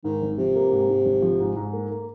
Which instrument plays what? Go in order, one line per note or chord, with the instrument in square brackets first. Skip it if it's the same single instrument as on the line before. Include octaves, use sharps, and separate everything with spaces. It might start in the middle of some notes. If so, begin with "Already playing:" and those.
[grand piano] G#2 [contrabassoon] D#3
[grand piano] G#1
[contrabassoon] C3 [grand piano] F3
[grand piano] A#3
G#2
G#2
G#1
F3
G#2
G#2
A#3
A#3